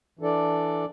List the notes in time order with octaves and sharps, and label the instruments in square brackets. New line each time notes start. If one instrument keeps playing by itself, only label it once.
[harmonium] E3 D4 A4 D5